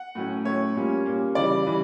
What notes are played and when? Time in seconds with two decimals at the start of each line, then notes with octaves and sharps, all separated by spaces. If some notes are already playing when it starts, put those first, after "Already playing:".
Already playing: F#5
0.15 A2 F#3 A3 C#4
0.45 A2 F#3 A3 C#4 C#5
0.75 A#2 G3 A#3 C#4
1.06 A#2 G3 A#3 C#4
1.35 C#3 E3 G3 D5
1.66 C#3 E3 G3